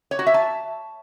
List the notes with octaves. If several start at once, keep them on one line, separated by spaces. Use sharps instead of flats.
C#5
F#4
E5
A5